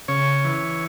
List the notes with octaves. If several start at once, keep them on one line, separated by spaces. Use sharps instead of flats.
C#3 C#5
E3